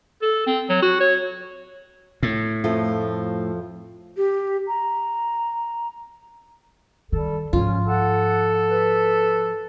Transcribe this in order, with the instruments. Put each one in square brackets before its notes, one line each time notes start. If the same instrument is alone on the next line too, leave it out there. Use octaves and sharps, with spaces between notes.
[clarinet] A4
C4
F#3
F#4
C#5
[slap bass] A2
[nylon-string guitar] F2 F3 A3
[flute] G4
A#5
[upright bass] D#3 [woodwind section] G3 A4
[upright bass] G#2 F3 [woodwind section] C#4 [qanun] F4
[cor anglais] A4 [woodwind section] F#5
[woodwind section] B4